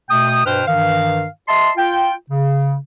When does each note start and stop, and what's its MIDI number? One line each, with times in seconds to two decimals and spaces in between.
0.09 0.42 47
0.09 0.42 57
0.09 0.42 79
0.09 0.42 87
0.45 0.62 43
0.45 0.62 47
0.45 0.62 71
0.45 0.62 72
0.45 0.62 79
0.45 0.62 89
0.68 1.26 43
0.68 1.26 51
0.68 1.26 52
0.68 1.26 77
1.48 1.71 75
1.48 1.71 76
1.48 1.71 81
1.48 1.71 84
1.77 2.13 65
1.77 2.13 79
2.30 2.75 49